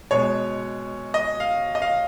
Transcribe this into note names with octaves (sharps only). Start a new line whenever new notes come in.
B2 G#3 C#5
D#5
F5
D#5
F5